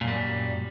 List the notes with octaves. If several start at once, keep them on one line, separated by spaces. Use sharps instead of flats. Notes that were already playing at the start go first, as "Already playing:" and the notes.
F#2 A#2 G3